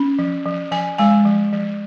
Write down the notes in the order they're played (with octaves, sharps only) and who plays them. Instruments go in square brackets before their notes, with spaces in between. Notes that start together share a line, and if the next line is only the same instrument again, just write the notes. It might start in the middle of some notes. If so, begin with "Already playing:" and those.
Already playing: [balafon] C#4
F3
F3
F3 G#5
G#3 G#5
F3
F3